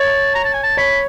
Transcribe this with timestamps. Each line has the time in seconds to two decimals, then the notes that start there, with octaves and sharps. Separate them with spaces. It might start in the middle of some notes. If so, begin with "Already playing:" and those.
Already playing: C#5 A5
0.35 A#5
0.44 A5
0.54 G#5
0.63 A5
0.77 C#5 B5